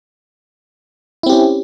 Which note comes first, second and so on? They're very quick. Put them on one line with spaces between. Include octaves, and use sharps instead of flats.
E4 C4 G4 C#4